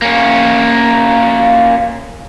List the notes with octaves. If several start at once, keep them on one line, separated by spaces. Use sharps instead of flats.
A#3 C#4